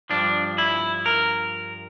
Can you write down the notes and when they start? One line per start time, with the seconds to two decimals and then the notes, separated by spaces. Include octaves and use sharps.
0.10 G2 F3 D4
0.58 E4
1.06 A#4